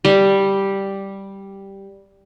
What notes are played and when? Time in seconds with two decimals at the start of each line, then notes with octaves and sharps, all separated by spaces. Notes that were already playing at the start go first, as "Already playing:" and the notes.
0.05 G3